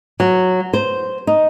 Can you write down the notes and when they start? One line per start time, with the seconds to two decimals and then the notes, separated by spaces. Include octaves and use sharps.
0.20 F#3
0.74 C5
1.27 D#4